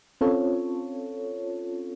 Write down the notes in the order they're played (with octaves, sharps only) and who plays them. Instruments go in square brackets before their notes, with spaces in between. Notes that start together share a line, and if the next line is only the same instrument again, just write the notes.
[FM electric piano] C4 C#4 F4 A4 C#5